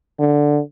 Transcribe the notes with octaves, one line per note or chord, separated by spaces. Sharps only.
D3